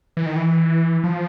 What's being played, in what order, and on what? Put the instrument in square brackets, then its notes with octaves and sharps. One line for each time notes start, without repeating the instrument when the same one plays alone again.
[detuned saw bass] E3
D#3
E3
F3